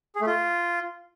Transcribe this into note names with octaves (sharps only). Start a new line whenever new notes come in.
G#4
A3
F4